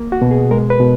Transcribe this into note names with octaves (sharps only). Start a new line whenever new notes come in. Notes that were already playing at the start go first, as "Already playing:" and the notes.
Already playing: A#3
F#4
B2
G#4
G#3 A#4
B4
B2